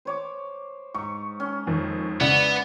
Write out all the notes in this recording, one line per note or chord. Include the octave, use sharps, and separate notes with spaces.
C5 C#5 D6
G#2 C#6
C#4
F2 D#3
C#3 B3 E4 D5 F#5